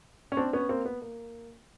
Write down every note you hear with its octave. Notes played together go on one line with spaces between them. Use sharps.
C#4
C4 D4
B3 C#4
A#3 C4
B3
A#3